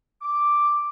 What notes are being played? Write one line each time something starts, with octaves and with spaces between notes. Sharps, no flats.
D6